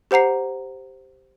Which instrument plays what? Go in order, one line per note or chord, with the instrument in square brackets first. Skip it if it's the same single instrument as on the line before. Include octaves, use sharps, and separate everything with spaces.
[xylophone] G4 C5 F#5 A#5 C7